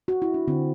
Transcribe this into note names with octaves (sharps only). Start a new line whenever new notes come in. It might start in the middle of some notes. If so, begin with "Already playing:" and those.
F#4
E4
D4
D3 C4